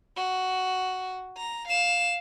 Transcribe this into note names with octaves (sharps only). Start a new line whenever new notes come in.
F#4
A#5
F5 E7